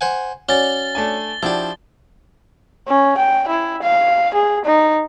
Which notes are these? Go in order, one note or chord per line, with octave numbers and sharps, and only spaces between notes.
C5 F#5 G#5
C#4 F#4 D5 A6 G7
A3 D4 G#5
F3 D4 E4 F#4 G4
C#4
G5
E4
F5
G#4
D#4